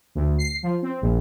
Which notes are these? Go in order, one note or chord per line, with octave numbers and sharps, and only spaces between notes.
D2
C7
F3
C4
A#1